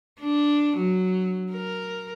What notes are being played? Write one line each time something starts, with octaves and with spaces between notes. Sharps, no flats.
D4
F#3
A#4